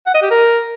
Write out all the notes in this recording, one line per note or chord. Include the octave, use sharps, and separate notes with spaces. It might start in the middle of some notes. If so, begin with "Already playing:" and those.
F#5
D#5
G4
A#4